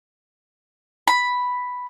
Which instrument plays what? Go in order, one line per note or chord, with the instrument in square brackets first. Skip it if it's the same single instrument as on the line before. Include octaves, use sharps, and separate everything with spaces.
[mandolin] B5